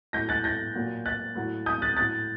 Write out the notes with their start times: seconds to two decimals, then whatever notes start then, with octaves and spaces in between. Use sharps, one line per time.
0.13 A2 F#3 G6 A#6
0.29 F#6 A6
0.44 G6 A#6
0.75 A#2 F#3
1.06 F#6 A6
1.35 A2 F#3
1.66 D#6 G6
1.82 F#6 A6
1.97 A2 F#3 F#6 A6